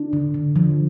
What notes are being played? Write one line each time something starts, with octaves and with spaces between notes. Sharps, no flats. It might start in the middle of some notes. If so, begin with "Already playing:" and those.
Already playing: D4
D3
D3
F3